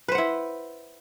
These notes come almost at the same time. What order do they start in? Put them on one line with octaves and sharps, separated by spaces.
B4 C5 F#5 E4